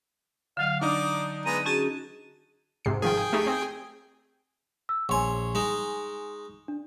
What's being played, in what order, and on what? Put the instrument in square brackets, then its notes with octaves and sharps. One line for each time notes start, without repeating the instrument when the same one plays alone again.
[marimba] D3 F#3 D#5 [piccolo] F5
[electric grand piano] D4 D#4 [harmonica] D5 D6 [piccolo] D#6
[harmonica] G#3 B3 A#5 [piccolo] D#7
[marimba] C#4 F#4 G#4 [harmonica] A5
[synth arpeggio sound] G#2 C3 C7
[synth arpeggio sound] G#1 D#3 F3 [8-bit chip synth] G#4 G5
[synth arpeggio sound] A3 D#4 G4
C4
[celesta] E6
[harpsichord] A#1 C#5 [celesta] G#5 C6 C#6
[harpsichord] G#3 D#4
[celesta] D4